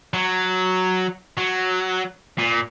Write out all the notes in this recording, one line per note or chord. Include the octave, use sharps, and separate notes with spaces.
F#3
F#3
A#2